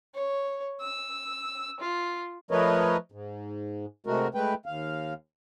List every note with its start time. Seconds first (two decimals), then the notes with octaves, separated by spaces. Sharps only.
0.14 C#5
0.80 E6
1.79 F4
2.51 F3 A3 A#4 B4 C#5 D#5
3.12 G#2
4.07 C3 G#3 A3 F#4 A#4
4.35 G#3 A3 B4 G5
4.66 D#2 F5